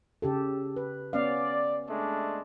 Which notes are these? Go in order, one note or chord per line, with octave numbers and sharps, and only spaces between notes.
C#3 G4 A4
B4
B3 C#4 D5 F5
G#3 A3 D4